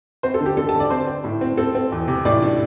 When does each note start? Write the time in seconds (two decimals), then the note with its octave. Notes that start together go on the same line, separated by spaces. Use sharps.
0.23 C4 C5
0.34 A4
0.41 D3
0.46 G4
0.57 D3 A4
0.69 A5
0.75 D3
0.80 D5
0.90 C4 C5
1.07 C4
1.24 A2
1.41 C4
1.57 C4 A4
1.75 C4
1.92 E2
2.08 C3
2.25 A2 D5
2.42 D4